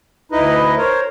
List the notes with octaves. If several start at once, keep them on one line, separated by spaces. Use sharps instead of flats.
D2 D#4 E4 B4 D#5
A#4 C5 C#5